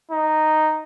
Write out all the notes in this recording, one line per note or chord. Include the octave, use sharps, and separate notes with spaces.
D#4